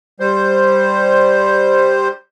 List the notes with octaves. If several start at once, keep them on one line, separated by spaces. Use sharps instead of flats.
G3 C5